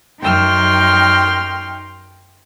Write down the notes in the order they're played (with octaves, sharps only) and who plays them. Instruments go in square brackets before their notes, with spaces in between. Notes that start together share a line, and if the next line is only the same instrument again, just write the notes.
[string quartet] F#2 D#4 G5 C6 F6